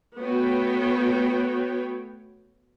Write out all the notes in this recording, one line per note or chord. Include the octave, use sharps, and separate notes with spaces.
A3 B3 F#4 C#5 G5